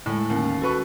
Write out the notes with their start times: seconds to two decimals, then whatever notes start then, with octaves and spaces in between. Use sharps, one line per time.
0.06 A2 D3 G#3
0.30 D#2 C#4
0.62 F#4 A4 B4 C#6